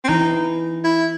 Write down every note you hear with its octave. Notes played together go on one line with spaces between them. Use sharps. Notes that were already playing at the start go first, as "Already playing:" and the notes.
C4
E3 D#4
E4